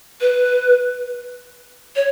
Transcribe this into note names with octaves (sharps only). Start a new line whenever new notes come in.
B4
C#5